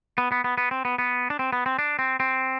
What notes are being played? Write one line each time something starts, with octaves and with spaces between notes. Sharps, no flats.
B3
B3
B3
B3
C4
B3
B3
D4
C4
B3
C4
D4
C4
C4